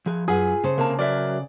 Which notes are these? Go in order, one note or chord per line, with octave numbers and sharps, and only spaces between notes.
F3 G#4
F#2 F4 G#4 B4 F#5 G#5
C#3 A4 C5
C3 A#3 A5
F#3 A#4 D5 E5